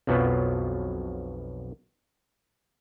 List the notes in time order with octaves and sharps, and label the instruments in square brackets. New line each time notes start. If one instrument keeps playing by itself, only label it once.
[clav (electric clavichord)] B1 F2 B2 F3 F#3 B3